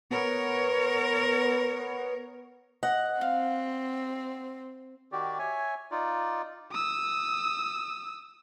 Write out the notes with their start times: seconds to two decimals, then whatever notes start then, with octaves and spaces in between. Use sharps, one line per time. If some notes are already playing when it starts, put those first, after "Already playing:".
0.11 B3 A#4 C#5
2.83 D#5 F#5
3.21 C4 F5
5.12 D#3 F#4 G4 D5
5.39 C#5 E5 G#5
5.91 D#4 F4 D5
6.72 D#6 E6